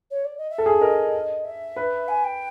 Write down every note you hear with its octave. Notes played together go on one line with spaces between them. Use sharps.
C#5
D5
D#5
E5
A4
G#4
A#4 D#5
E5
B4
G#5
G5